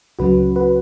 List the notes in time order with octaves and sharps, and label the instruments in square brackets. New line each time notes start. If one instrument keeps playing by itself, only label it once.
[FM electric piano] C#2 C#3 F#3 C#4 F#4 B4
F#4 B4